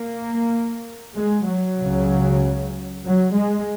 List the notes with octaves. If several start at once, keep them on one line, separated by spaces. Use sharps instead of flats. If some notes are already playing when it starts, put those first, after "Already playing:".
Already playing: A#3
G#3
F#3
C#2 C#3
F#3
G#3